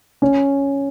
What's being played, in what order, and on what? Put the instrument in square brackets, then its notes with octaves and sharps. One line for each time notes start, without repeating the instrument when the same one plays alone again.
[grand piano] C#4